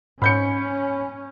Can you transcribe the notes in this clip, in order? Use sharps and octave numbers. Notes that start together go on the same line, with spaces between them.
G#2 C#4 B5 G6 C#7